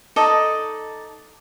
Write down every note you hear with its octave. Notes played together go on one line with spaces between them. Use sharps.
D#4 A4 D5 D#5